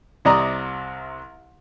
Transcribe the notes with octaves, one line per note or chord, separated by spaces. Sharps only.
C2 C3 D5 D#5 A#5